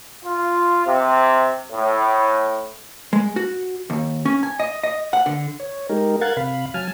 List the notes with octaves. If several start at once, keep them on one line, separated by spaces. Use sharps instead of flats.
F4
C3
A2
G#3
F#4
D#2
C#4
G#5
D#5
D#5
F#5
D3
C#5
G#3 D#4 G4 A#4
A#4 F5 F#5 F#6 G#6 A6
C3 F5 B5
F#3 G#5 A5 F6